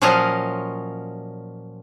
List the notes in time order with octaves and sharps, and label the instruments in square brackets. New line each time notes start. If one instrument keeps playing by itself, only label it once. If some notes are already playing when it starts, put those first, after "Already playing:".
[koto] A#2 F3 F#3 C#4 D#5 F5